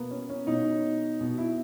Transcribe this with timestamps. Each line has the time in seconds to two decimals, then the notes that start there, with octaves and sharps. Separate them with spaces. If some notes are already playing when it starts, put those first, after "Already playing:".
Already playing: B2 A#3 B3
0.11 C#4
0.29 C#4
0.47 B2 D#4
1.21 B2
1.38 E4